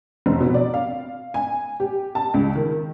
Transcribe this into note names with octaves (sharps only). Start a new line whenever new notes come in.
F1
B2
D5
F5
G#5
G4
A5
C#2
D#3